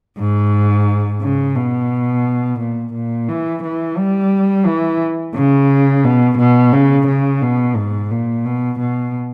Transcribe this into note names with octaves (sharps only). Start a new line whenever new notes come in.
G#2
C#3
B2
A#2
A#2
E3
E3
G3
E3
C#3
B2
B2
C#3
C#3
B2
G#2
A#2
B2
B2